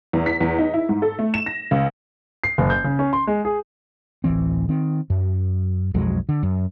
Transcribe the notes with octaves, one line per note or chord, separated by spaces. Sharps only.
E2
B6
E2
D#4
E4
G#2
A4
A3
E7
A#6
C#2
C7
F#1
G6
C#3
C#4
C6
G#3
G#4
D1 A1 E3 C4
D#3 C4
F#2
B1 F2 F#3 G#3
D3
F#2